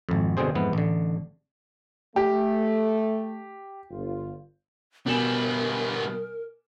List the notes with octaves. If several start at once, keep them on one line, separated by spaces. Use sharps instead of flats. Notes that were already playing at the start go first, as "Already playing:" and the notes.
G#1 F2
G1 B2 D3 C4 G#4 C5
F2 G#2 E3 B3
A1 D3
A3 G4
G1 F4
B2 G3 B3 A#4 G#5 E7